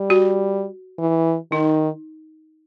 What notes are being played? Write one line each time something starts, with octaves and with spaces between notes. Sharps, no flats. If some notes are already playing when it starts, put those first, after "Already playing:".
Already playing: G3
F#4
E3
D#3 D#4